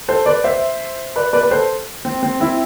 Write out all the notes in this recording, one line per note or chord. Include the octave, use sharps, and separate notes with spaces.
A4 C5
B4 D5
C5 E5
B4 D5
B4 D5
B4
A4 C5
C4
C4
C4 E4